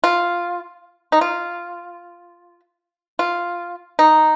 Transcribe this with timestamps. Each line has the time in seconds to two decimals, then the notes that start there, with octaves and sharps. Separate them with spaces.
0.04 F4
1.12 D#4
1.21 F4
3.19 F4
3.99 D#4